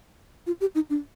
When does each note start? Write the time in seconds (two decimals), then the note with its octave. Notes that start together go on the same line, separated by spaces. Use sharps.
0.47 F4
0.61 G4
0.75 D#4
0.90 D4